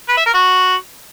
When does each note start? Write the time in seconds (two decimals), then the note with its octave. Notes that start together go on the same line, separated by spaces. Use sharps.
0.09 B4
0.17 E5
0.26 A#4
0.34 F#4